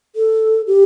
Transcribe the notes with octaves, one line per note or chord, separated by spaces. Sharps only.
A4
G4